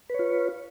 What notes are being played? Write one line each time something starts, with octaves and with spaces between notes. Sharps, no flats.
F4 B4 C#5